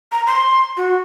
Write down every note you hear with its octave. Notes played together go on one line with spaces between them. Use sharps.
A#5
C6
F#4